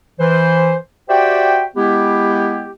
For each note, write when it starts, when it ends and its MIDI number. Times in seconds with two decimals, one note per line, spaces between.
0.20 0.75 52
0.20 0.75 72
1.09 1.65 66
1.09 1.65 67
1.09 1.65 72
1.09 1.65 74
1.09 1.65 76
1.09 1.65 79
1.76 2.71 56
1.76 2.71 59
1.76 2.71 64
1.76 2.71 67